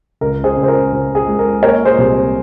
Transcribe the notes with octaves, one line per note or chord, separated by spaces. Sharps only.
C#2 A#4
G#4 C5
C#2
C5
A#4
C#3
G#4
G#3
A#4
A#3 A#4 C#5
G#4 C5
C2